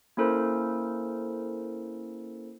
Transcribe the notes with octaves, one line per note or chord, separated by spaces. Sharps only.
A#3 C#4 E4 A4 A#4 C5